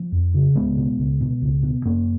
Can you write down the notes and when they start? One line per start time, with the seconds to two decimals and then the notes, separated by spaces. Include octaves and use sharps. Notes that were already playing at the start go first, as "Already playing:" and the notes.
Already playing: F3
0.12 F2
0.34 C#3
0.55 C#2 G#3 B3
0.77 B2
0.98 C#2
1.21 B2
1.42 C#2
1.63 B2
1.85 F#2 A#3 C#4